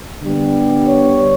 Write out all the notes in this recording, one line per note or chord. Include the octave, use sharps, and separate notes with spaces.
D3 G3 B3
C#5